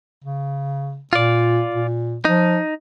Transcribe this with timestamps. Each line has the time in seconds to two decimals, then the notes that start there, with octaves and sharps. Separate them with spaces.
0.24 C#3
1.13 A#2 F4 D5
1.74 A#2
2.25 F3 D#4